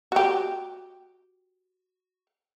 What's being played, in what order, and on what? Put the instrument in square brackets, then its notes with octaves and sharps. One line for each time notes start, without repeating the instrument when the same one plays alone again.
[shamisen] F#4 G4